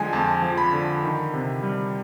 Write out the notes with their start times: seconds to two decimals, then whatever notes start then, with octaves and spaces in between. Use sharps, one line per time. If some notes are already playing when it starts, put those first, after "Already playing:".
Already playing: D3 F3 G#3 G#5
0.13 F2 A5
0.42 F3
0.58 B5
0.73 D3
1.03 D#3
1.34 C3
1.63 G3